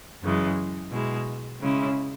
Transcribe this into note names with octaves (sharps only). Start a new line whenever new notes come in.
F#2 C#3 E3 G#3
B2 G#3 E4
C#3 G#3 C#4 E4